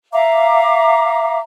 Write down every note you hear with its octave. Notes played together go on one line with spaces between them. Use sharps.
E5 F5 A#5 D6